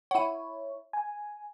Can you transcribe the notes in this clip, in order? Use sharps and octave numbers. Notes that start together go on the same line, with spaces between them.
E4 C#5 F#5 D#7
G#5